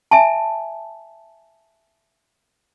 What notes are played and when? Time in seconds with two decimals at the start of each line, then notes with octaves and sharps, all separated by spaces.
0.11 E5 G#5 A5